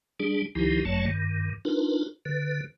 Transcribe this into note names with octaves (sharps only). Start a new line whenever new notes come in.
G3 D4 G#4
C#2 D#3 F3 D#4 E4 G4
G1 F#2 F#3 A3 C#5 A5
G2 D#3
D4 D#4 F4 A#4 B4
D3 B4